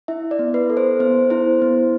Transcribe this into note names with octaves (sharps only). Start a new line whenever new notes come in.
E4 E5
D5
B3
B4
A4
C5
B3 C5
E4 C5
B3